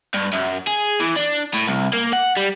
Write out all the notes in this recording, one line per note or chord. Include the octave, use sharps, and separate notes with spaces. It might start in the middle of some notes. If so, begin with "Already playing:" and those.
G2
F#2
G#4
E3
D4
A2
C2
A#3
F#5
G3